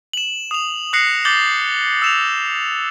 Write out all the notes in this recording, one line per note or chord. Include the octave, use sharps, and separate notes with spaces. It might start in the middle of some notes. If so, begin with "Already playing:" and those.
E7 F#7
D#6 F7
D#6 F#6 A#6 C7 C#7
D6 G6 A6 F#7 G7
E6 E7 F7